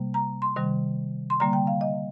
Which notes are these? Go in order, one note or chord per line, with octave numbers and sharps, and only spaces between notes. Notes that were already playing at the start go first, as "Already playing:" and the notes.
Already playing: C3 G3 A#3
A#5
C6
C3 D#3 G3
C6
D3 G3 A#3 A#5
G5
F5
D#5